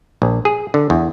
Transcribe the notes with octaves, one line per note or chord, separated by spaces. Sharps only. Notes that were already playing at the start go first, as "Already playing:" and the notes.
A#1
G#4
D3
E2